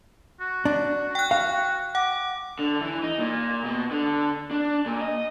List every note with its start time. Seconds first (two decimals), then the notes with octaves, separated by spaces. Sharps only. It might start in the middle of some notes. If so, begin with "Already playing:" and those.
0.41 F#4
0.65 D4
1.15 G5 F#6
1.31 F5
1.95 F#5 D6
2.59 D3
2.81 E3
3.03 D#4
3.19 A#2
3.65 B2
3.91 D3
4.51 D4
4.86 A#2
5.01 D#5